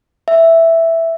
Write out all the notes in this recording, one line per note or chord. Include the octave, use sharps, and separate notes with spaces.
E5